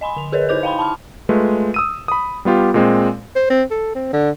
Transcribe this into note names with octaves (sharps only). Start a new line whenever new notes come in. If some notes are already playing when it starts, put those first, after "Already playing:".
D#5 G#5 B5 C6
D3 F7
G#4 A#4 B4 C#5 D#5
D#4 E4 C5 D6 G6 F7
F5 G5 B5 C6
A5 B5 C6 F6
G#3 A3 F4 B4
D#6 E6 D#7
B5 D#6
G3 B3 F4 G4
A#2 G#3 C4
C5
C4
A4
C4
D3